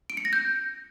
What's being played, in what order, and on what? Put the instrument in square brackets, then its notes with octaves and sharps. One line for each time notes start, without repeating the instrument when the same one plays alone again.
[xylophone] D7
C#7
A#6
G6